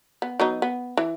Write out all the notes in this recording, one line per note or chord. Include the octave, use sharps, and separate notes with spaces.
B3
F#3 B3 D#4
B3
E3